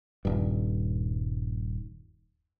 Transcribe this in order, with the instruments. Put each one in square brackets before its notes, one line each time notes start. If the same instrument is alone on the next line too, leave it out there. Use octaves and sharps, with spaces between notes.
[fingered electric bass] D#1 G2